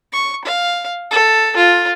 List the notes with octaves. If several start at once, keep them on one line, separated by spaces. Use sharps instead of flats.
C#6
F5
A4
F4